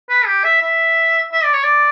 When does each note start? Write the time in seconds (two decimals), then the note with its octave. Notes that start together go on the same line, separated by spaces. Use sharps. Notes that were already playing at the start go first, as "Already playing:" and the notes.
0.09 B4
0.26 G4
0.44 E5
0.62 E5
1.33 E5
1.44 D5
1.54 C#5
1.64 D5